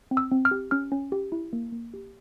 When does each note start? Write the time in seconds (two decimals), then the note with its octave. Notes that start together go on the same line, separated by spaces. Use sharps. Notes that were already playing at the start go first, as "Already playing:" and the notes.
0.11 C4
0.17 E6
0.31 C4
0.45 F6
0.51 G4
0.71 C#4 F6
0.92 C#4
1.12 G4
1.32 E4
1.53 A#3
1.72 A#3
1.94 G4